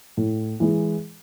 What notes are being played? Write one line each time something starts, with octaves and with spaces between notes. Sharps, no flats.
A2
E3 G#3